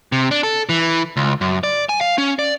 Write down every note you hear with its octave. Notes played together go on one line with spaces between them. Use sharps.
C3
D4
A4
E3
C#2
F#2
D5
G#5
F5
C#4
D5